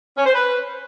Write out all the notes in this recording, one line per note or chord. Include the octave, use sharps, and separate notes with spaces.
C#4
C5
B4